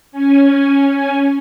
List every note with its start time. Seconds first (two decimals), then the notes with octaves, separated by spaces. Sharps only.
0.12 C#4 G#5